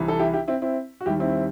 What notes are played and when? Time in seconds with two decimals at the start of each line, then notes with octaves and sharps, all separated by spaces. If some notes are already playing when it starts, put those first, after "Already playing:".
Already playing: C2 C3 E3
0.08 A4
0.19 E4 G4
0.33 E4 G4
0.48 C4 E4
0.62 C4 E4
1.01 F#4
1.06 D#2 D#3 G3 E4 G4
1.20 C4 E4